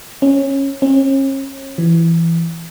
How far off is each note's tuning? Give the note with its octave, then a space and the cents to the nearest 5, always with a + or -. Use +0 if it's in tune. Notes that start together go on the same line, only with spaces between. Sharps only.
C#4 -15
C#4 -40
E3 +15